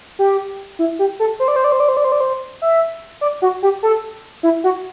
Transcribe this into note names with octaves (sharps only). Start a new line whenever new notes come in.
G4
E4
G4
A4
C5
D5
C5
D5
C5
D5
C5
D5
C5
D5
C5
E5
D5
F#4
G4
A4
E4
F#4